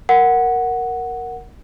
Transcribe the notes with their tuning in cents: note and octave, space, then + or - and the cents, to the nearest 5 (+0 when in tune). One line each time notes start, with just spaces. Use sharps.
A#4 +0 F#5 +0